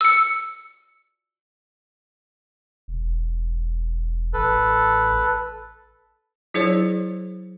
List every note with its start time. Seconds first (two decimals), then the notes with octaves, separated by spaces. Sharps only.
0.01 E6 C#7
2.88 E1
4.34 A1 A4 B4
6.54 F#3 E4 G#4 C5 C#5